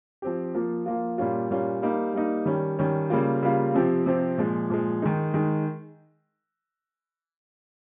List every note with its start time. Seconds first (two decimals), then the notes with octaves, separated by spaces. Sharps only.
0.22 F3 C4 G4
0.55 F3 A#3 F4
0.86 F3 A#3 F4
1.18 A#2 G3 A#3 C#4 F4
1.51 A#2 G3 A#3 C#4 F4
1.82 G3 A#3 D#4
2.14 G3 A#3 D#4
2.46 D#3 G3 C#4
2.79 D#3 G3 C#4
3.10 C#3 G3 A#3 F4
3.42 C#3 G3 A#3 F4
3.74 C3 F3 C4 G4
4.06 C3 F3 C4 G4
4.38 A#2 F3 G#3
4.70 A#2 F3 G#3
5.02 D#3 G#3 D#4
5.34 D#3 G#3 D#4